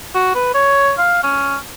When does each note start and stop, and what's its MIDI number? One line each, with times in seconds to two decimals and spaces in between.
0.15 0.34 66
0.35 0.52 71
0.54 0.93 73
0.98 1.20 77
1.23 1.57 61